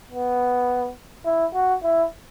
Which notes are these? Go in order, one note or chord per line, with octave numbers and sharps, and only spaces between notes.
B3
E4
F#4
E4